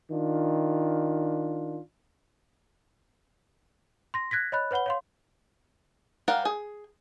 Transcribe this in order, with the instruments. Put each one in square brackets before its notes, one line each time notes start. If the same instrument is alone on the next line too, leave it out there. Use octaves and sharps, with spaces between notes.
[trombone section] D#3 D4 F4
[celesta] C6 A#6
F#6 G#6 A#6 B6
C#5 D#5 B5 F#6
B4 C#5 F#5 B5 G7
C#5 F5 C6
[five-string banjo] G3 A#4 F5 F#5
G#4